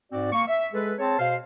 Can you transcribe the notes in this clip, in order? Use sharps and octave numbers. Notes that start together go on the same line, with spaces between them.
G#2 C4 F#4 D5
A#3 C#6
E5
G#3 G#4 A4 B4
C4 G#4 C#5 A5
B2 C5 F5